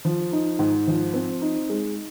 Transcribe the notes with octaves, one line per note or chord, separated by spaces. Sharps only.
F3
D#4
G#2
F3
C4
D#4
G#3